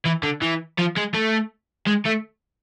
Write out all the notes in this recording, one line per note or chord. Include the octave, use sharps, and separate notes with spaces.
E3
D3
E3
F3
G#3
A3
G#3
A3